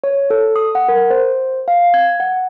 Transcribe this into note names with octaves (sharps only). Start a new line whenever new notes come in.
C#5
A4
D#6
F#5
A#4
C5
F5
G#6
F#5